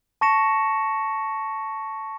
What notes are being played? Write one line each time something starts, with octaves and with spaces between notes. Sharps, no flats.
A5 C#6 A#6 C#7 E7